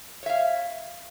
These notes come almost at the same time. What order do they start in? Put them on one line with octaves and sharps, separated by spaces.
C#5 E5 F5